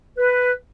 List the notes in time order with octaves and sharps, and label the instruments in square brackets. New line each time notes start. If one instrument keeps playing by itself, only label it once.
[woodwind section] B4